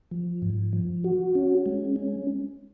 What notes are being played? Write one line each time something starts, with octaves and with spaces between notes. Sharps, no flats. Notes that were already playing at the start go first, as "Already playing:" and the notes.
F3
G#2
F3
F#4
C#4
G#3
C#4